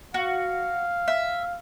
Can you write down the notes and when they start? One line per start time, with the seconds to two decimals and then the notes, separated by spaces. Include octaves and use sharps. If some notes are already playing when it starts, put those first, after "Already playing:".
0.14 F#4 F5
1.08 E5